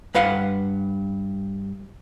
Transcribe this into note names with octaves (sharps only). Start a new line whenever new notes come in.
G2 B4 F5 F#5